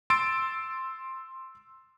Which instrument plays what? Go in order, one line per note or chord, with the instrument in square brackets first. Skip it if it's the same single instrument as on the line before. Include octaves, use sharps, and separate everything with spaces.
[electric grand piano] C6 E6 A6 D7